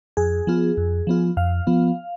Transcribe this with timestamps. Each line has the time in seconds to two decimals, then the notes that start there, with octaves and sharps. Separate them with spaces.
0.17 F2 G#4
0.47 F3 B3 F4
0.77 F2
1.07 F3 B3 F4
1.37 F2 F5
1.67 F3 B3 F4